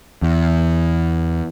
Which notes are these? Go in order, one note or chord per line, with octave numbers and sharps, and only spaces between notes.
E2